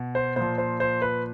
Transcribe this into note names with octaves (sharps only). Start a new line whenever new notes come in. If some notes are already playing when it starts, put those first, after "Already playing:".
Already playing: B2
C5
A#2 F3 C5
C5
C5
B4